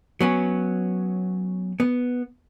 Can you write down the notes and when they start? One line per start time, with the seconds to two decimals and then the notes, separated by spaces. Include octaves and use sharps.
0.20 F#3 B3 C#4
1.80 B3